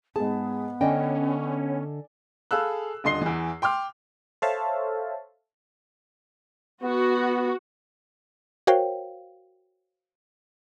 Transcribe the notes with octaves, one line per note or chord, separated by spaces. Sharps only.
G#2 B3 G#4 A5
D3 C#4 D5 D#5 G5 G#5
G#4 A4 F5 B5 E6 F#6
D#1 D3 D#5 C6 C7 G7
E2 E3
G5 C6 D6 F6
A4 C5 C#5 E5 F5 A5
B3 F#4
F#4 A#4 C5 C#5 F5 G5